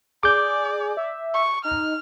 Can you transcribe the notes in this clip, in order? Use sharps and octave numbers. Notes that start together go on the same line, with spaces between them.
G#4 D5 D6 G6
E5
C#6
D#4 F6